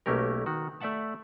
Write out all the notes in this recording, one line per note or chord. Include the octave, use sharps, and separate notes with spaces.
B1 A3 A#3 C#4 G4 A#4
D#3 F#4
A3 D5 E5 F#5 A5